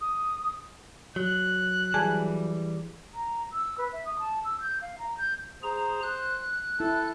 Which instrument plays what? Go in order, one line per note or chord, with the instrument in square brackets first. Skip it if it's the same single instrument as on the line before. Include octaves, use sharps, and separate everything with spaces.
[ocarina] D#6
[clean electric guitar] F#3 [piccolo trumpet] F#6
[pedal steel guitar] E3 G3 [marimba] G#4 G#5 A5
[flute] A#5
E6
B4
E5
D#6
A5
E6
G6
F5
A#5
G6
[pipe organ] G#4 A#5 [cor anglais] C5
[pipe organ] F#6
[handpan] E4 [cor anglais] A4